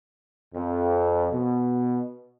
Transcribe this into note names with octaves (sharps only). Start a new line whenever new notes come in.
F2
B2